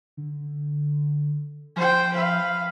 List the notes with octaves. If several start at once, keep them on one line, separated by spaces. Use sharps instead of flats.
D3
F3 C5 G5
B4 F5